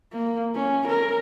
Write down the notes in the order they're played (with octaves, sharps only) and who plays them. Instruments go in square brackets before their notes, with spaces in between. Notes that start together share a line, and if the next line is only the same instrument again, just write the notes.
[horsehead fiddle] A#3
C#4
A#4